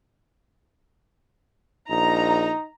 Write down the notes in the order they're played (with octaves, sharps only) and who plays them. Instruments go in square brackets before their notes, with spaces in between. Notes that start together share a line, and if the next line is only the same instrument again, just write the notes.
[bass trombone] A#1 [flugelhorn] D#4 [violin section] A#5